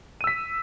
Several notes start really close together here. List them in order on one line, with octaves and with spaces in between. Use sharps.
D#7 E6 B6